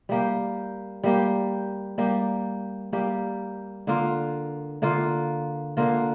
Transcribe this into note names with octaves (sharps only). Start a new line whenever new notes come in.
G3 A#3 G4
G3 A#3 G4
G3 A#3 G4
G3 A#3 G4
D3 A#3 F4
D3 A#3 F4
D3 A#3 F4